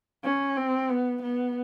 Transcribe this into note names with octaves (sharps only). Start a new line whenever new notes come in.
C#4
C4
B3
B3